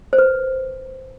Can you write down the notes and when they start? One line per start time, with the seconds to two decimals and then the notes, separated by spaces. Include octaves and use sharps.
0.13 C5
0.18 B4